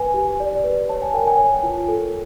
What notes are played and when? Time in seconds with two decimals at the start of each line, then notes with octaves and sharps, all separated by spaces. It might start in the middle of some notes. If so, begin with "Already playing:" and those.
Already playing: B4 G#5
0.14 G4
0.40 D5
0.64 B4
0.89 C#5 A5
1.02 G#5
1.14 A#4 G5
1.27 G#5
1.38 C#5
1.63 F4
1.88 A4